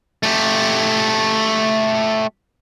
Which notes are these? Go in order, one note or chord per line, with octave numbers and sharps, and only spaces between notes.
A3 G4